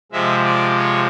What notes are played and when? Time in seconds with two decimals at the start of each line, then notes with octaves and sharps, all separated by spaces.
0.12 C3 F3 G#3 E5
0.45 D5
0.78 C#5